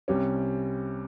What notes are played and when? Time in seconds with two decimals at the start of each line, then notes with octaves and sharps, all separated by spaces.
0.08 C2 C3 G3 C#4